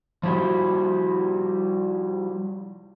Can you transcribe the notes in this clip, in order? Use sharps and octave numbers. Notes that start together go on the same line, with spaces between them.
F3 G3 E4 F#4 G4